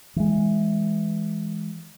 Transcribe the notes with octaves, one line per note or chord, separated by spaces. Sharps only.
E3 G#3